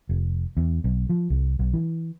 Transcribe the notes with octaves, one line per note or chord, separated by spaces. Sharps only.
F1
E2
B1
F3
C2
B1
E3